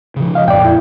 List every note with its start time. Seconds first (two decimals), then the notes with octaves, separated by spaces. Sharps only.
0.16 C#3 F3
0.35 D#5 F5
0.48 F2 A#2 D5 G5
0.65 E4